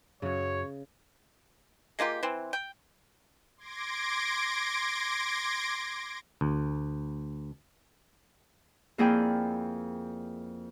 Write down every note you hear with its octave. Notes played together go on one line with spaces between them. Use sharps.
F#2 C#3 F#3 C#5
G#3 A#3 F4 G4
E3 C4
G5
C6 D6 G#6 A#6 D7
D2
F2 A#3 E4 G#4 D5 G5